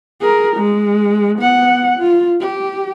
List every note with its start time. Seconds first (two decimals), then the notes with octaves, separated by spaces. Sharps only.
0.21 G#4 A#4
0.56 G#3
1.39 B3 F#5
1.99 F4
2.41 G4